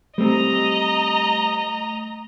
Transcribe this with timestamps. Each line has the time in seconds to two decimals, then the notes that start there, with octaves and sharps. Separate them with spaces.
0.18 G3 A3 C4 D#5 A#5